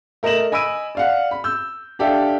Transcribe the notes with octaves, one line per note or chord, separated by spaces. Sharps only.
A3 A#4 D#5 A#5 E7 F#7
D#5 G#5 B5 E6 D7 D#7
D5 F5 F#5
B5
E6 G6
D4 G4 A4 E5 F5